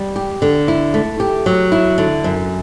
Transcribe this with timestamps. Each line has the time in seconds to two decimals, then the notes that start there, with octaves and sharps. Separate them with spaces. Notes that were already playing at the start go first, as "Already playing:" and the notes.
Already playing: G3
0.16 G4
0.42 D3
0.68 E4
0.94 A3
1.20 G4
1.46 F#3
1.72 E4
1.98 D3
2.24 F#2